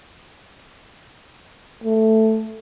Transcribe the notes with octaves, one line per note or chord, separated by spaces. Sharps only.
A3